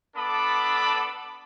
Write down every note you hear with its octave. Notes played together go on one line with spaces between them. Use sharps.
B3 D4 A4 A5 B5 D6